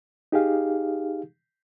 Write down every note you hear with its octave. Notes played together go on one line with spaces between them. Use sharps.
D#4 G4 G#4 F5